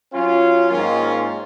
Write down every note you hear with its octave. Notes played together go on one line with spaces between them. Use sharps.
F#3 C#4 F4
G#2 D#3 A#3 C#4 F4